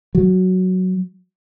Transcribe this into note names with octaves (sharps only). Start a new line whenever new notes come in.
F#3